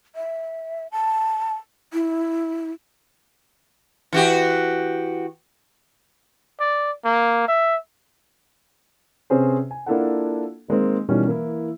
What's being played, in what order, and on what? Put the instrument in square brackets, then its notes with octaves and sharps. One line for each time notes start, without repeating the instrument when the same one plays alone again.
[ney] E5
A5
E4
[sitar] E3 F#4 G4
[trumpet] D5
A#3
E5
[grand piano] C3 C4 C#4 G#4 B4 C5
G#5
A#3 D4 E4 F4 A4 F#5
D#3 G#3 A#3 C4
B2 D#3 E3 G3 C#4
E3 A#3 E4